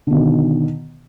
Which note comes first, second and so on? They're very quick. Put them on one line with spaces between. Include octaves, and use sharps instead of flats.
D3 B2 D#3